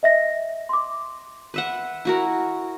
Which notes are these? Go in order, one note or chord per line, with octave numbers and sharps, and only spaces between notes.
D#5 E5 A#6
C6 D6
B4 E5 F#5
E4 F#4 A#4